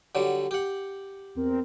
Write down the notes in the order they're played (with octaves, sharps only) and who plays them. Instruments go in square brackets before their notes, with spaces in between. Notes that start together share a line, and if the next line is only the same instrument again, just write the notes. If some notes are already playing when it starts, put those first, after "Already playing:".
[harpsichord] D3 F#3 G3
G4 F#5
[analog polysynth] E2 C4 A#4